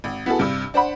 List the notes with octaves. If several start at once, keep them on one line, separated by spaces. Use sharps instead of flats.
G#1
B3 E4 F#4 G#4 A4
G2 C3
D4 C5 F#5 B5